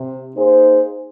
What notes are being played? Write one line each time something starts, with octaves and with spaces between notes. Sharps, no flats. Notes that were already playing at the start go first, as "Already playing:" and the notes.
Already playing: C3
A#3 D#4 G#4 C5